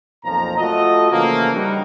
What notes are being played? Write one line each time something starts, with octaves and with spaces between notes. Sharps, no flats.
B1 F2 A#2 F3 A#5
A3 F4 F#4 A4 D#5
C#3 E3 F3 A3 A#3
G3 D4 D#4 F#4